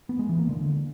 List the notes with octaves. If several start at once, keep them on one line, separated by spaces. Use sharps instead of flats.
B3
G#3
E3
A#3
D3